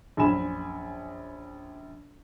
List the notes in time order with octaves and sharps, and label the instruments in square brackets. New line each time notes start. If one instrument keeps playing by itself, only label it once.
[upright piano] A#1 F#2 G#5 B5 E7